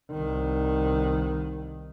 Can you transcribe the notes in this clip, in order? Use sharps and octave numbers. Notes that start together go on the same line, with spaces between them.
C2 D#3